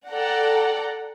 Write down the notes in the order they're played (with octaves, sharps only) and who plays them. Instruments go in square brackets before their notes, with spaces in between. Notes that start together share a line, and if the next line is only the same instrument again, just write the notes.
[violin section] A4 D5 F#5 G5 A#5